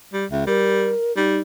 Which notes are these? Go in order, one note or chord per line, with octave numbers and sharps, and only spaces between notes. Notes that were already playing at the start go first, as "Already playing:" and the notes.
G3
C#2 E5
G3 A#4
G3 D#4